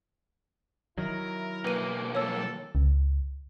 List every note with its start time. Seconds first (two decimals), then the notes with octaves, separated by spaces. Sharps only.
0.98 D#3 F#3 E4 A#4
1.65 B1 A#3 B4 D#7
2.15 A4 C#5 E6
2.75 C#2